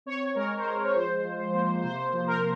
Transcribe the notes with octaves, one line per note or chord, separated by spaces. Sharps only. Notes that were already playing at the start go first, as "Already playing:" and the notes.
C4 C#5
G#3 A#4
C5
G#3 A#4
C#5
F3 C5
F3
A#3
C3 C5
F3
A#4